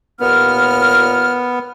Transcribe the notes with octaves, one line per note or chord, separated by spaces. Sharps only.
D#2 A#2 B3 F6